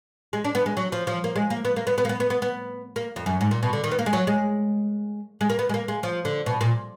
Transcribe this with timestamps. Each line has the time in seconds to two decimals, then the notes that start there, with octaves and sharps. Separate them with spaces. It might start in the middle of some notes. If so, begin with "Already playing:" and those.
0.33 G#3
0.44 D4
0.55 B3
0.66 G#3
0.77 F#3
0.92 F3
1.07 F3
1.24 A#3
1.36 G#3
1.50 A#3
1.65 B3
1.76 A#3
1.87 B3
1.98 B3
2.05 A#3
2.09 B3
2.20 B3
2.30 B3
2.42 B3
2.96 A#3
3.16 F2
3.26 F#2
3.41 G#2
3.51 A#2
3.63 B2
3.73 D3
3.84 D#3
3.91 B3
3.99 A#3
4.06 G#3
4.13 F#3
4.27 G#3
5.41 G#3
5.50 A#3
5.59 B3
5.69 G#3
5.74 A#3
5.88 G#3
6.03 F3
6.25 D3
6.46 B2
6.61 A#2